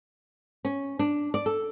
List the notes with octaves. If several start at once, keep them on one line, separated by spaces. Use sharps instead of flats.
C#4
D4
D5
A4